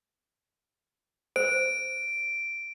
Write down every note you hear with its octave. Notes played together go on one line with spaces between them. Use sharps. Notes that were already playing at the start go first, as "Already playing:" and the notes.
C5 D7